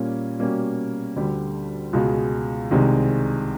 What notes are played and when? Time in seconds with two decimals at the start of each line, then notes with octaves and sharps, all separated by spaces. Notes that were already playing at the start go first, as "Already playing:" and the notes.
Already playing: A#2 G3 A#3 C#4
0.39 B2 G3 A#3 C#4
1.16 D2 D3 G3
1.93 C#2 B2 G#3
2.71 C2 C3 D#3 G#3